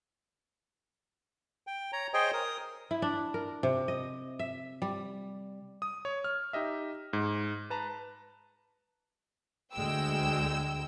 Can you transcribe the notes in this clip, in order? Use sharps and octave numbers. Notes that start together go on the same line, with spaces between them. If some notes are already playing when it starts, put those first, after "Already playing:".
G5
C#5 A#5
G#4 C5 C#5 D#5 G5
A#4 D#6
E4
D4
A#4
C3
D#5
E5
G3
D#6
C#5
F6
D#4 G4 D#5 E5
G#2
B4 A5 A#5
D2 G#3 G5 E6